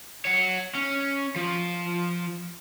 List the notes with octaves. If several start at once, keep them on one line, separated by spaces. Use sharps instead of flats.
C#5 F#5
C#4
F3